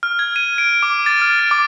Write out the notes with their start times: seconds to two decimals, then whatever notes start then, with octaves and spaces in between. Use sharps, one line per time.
0.03 F6
0.19 G#6
0.36 D#7
0.58 D7
0.83 D6
1.06 A6
1.21 F6
1.39 D7
1.51 D6